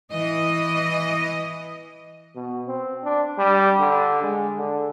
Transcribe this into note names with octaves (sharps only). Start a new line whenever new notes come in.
E3 D#5
B2
C4
D4
G3
D3
G#3
D3